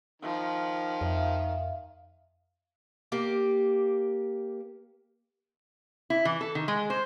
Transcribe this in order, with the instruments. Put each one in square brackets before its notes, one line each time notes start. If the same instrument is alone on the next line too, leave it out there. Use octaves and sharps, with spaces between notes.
[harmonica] D#3 [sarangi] F3
[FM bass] F2 [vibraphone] E5 F5
[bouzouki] A#3 G4 D5
[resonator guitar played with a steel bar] E4
E3
A4
D#3
G#3
C5